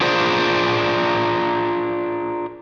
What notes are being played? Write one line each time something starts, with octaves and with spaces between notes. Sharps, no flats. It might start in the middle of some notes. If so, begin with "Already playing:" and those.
D4 F4 G#4 A#4 C5 D5